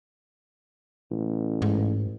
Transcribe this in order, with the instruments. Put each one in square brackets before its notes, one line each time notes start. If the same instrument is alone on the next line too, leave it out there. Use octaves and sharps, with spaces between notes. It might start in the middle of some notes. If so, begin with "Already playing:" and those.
[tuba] A1
[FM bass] G#2